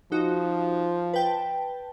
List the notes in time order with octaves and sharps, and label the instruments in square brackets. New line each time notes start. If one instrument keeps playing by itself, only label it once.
[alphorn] F3 [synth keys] D#4 F#4
[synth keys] B4 G5 A5